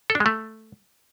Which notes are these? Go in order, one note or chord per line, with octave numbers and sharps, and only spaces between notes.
A4
D4
G#3
A3